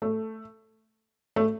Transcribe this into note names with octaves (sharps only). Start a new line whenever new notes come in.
A3
A3